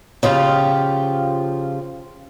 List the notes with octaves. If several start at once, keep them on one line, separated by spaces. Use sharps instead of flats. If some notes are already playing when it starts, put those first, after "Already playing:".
C#3 F3 F4 G4